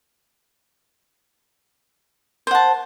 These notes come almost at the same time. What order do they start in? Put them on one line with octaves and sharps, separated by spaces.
C5 F#5 A5